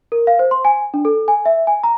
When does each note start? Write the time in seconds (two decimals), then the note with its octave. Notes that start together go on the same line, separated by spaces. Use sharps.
0.12 A#4
0.27 F5
0.39 C5
0.51 C6
0.65 G#5
0.94 D4
1.05 A4
1.28 G#5
1.45 E5
1.67 G#5
1.84 A#5